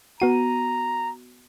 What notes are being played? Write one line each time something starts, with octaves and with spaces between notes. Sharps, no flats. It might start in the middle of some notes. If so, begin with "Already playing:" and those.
B3 F#4 A#5 D#7